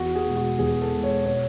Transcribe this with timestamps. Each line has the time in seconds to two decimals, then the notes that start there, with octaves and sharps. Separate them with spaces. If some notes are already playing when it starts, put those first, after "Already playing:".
Already playing: E2 F#4
0.15 G#4
0.26 B2 G#3
0.36 F#4
0.58 E2 G#4
0.82 A4
0.92 B2 G#3
1.04 C#5
1.25 B2 C#5